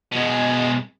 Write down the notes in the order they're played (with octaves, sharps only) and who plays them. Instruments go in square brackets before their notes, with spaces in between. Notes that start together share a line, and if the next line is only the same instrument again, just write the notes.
[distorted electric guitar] B2 G#3